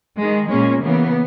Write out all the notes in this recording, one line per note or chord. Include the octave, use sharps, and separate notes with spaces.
D#3 G#3
A#2 G#3 A#3 C#4
C#3 E3 A#3 B3